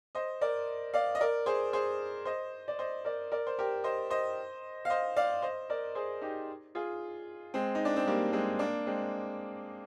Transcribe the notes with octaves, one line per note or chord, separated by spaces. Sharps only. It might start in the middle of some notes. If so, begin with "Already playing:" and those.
C5 D#5
A#4 D5
D5 F5
D#5
A#4 D5
G#4 C5
G#4 C5
C5 D#5
D5
C5 D#5
A#4 D5
A#4 D5
C5
G4 A#4
C5 D#5
C5 D#5
F5
C5 D#5
D5 F5
C5 D#5
A#4 D5
G#4 C5
D#4 G4
F4 G#4
G#3 C4
D#4
D4
C4
G3 A#3
G#3 C4
A#3 D4
G#3 C4